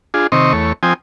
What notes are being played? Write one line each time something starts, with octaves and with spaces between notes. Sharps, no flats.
D4 F4 G#4
C3 D#3 C4 D#5 C#6
E2 A3 C#5
F3 C4 G5 G#5 D#6